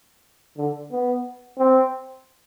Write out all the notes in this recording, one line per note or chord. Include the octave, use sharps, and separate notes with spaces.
D3
B3
C4